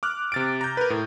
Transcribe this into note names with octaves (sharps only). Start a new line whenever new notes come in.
D6 F6 F#6
C3 A6 D7
A#5 G6
A#4 B4
A2